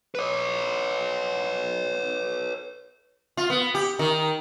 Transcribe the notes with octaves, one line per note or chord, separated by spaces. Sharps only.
B4 C#5
F4
B3
G4
D#3